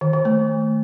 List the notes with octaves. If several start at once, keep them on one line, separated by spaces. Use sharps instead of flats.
D#3
D#3
A3